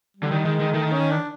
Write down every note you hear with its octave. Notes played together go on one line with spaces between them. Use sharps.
G3
D3
D#3
D#3 G#3
D#3
D#3 A3
C#4
D4